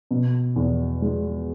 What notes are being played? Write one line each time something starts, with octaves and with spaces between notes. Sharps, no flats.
B2
E2
G#3